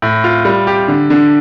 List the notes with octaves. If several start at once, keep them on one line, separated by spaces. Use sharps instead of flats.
A2
F4
G3
G4
D3
D3